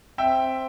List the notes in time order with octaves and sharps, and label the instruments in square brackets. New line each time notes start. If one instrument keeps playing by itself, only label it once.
[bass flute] C4 [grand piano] E5 G5